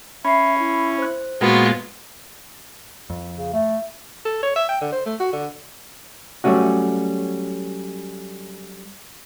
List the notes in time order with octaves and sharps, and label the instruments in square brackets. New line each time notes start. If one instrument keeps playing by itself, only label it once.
[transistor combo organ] C#4 [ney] E5 [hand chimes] B5 C7
[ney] E4
[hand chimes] C5 F#6
[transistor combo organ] A#2 G#3 [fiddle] B3 F4 [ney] F#4
[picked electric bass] F2
[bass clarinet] C#3
A3
[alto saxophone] A4
C#5
E5
G5
D3
C5
A3
F#4
D3
[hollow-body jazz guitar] F#3 G3 A3 C#4 F#4